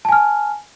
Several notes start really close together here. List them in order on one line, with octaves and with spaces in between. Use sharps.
A5 G#5 F6